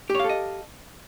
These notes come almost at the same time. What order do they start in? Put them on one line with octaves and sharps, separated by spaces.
G4 C#5 F5 A4 D#5